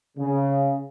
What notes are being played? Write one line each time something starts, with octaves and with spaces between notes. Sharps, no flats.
C#3